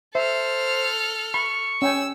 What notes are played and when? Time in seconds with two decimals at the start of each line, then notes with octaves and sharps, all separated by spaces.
0.15 A4 C5 E5 F6
1.34 B5 C#6
1.82 C#4 G5 G#5 E6